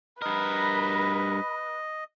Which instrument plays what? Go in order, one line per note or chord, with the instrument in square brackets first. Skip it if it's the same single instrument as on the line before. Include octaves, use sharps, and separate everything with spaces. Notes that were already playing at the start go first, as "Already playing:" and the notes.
[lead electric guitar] G2 A#4 [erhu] B4 [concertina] D#5 [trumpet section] B5